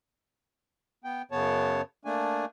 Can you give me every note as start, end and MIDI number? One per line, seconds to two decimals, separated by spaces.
1.04 1.22 59
1.04 1.22 79
1.31 1.82 42
1.31 1.82 49
1.31 1.82 59
1.31 1.82 73
1.31 1.82 81
2.05 2.45 57
2.05 2.45 58
2.05 2.45 62
2.05 2.45 80